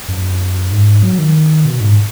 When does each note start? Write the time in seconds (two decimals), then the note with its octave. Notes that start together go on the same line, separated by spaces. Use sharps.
0.08 F#2
0.72 G#2
1.02 F#3
1.18 D#3
1.65 B2
1.81 G#2